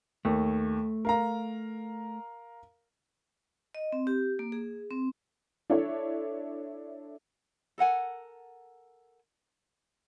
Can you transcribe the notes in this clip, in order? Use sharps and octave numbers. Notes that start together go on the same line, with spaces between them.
D#2 A3
A#4 F5 A#5
D#5
C4
G4
A#3
G#4
C4
D4 E4 A4 C#5
A4 A#4 F#5 G#5